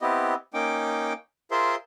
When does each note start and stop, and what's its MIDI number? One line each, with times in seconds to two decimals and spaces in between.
0.01 0.34 59
0.01 0.34 60
0.01 0.34 64
0.01 0.34 67
0.01 0.34 75
0.54 1.13 58
0.54 1.13 61
0.54 1.13 63
0.54 1.13 79
0.54 1.13 86
1.51 1.75 65
1.51 1.75 68
1.51 1.75 70
1.51 1.75 72
1.51 1.75 76
1.51 1.75 84